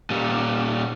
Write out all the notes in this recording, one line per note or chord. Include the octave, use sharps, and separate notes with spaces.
A#2 G3